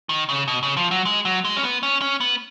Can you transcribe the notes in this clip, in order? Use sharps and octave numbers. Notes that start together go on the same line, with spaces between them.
D#3
C#3
B2
C#3
F3
F#3
G#3
F#3
G#3
C#4
B3
C#4
C#4
B3